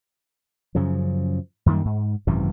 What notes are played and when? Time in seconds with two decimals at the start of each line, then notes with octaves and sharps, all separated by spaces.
0.75 F#2 C#3 F3
1.66 F#2 D#3 G3 A#3
1.85 G#2
2.27 G#1 F#2 C3 E3